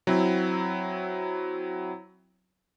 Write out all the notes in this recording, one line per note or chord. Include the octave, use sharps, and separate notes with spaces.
F#3 C4 E4